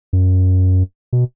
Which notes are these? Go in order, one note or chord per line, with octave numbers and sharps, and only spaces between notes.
F#2
B2